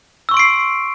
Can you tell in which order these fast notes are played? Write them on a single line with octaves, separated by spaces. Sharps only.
E6 C#6 C6 D7 C7